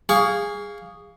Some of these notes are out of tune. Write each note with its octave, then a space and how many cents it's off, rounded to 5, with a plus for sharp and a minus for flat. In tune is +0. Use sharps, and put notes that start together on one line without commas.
G#4 -15 F5 +0 C#6 +30